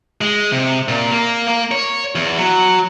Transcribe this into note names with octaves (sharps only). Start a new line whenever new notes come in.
G#3
C3
A#2
A#3
A#3
C#5
E2
F#3